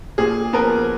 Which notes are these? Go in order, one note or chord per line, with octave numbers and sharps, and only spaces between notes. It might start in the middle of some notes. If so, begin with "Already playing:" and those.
A#2 G#4
F3 B3 A#4